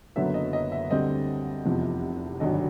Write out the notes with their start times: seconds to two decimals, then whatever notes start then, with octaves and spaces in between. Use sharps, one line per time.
0.16 F#1 F#2 D3 F#3 B3 E5
0.34 D#5
0.53 D#5
0.72 E5
0.90 D2 D3 G3 C4 D#5
1.65 F1 E2 C3 F3
2.40 G#1 G2 D3 F#3 D#5